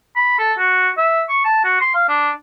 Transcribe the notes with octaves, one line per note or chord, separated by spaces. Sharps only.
B5
A4
F#4
E5
C#6
A5
F#4
C6
F5
D4